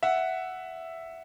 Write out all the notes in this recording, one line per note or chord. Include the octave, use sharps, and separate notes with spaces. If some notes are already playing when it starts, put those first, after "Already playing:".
E5 F#5